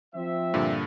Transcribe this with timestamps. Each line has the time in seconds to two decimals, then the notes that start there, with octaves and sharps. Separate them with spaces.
0.14 F3 C4 E5
0.54 G2 A#2 D3